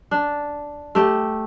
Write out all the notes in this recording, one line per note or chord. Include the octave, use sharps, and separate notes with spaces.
D4
A3 G4